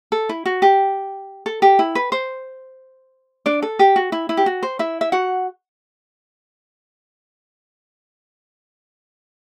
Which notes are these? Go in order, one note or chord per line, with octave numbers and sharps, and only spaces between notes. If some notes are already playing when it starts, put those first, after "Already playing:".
A4
E4
F#4
G4
A4
G4
E4
B4
C5
D4 D5
A4
G4
F#4
E4
E4
G4
F#4
C5
E4 E5
E5
F#4 F#5